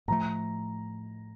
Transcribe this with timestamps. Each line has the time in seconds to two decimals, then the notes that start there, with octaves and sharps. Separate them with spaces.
0.08 A2 F3 A3 A#5